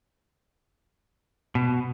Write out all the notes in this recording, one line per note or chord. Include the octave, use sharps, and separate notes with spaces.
B2